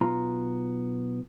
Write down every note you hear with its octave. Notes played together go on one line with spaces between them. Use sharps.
B1 B3 F4 A#5